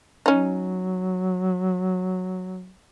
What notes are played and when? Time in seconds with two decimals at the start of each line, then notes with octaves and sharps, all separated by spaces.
0.26 F#3 C#4 D#4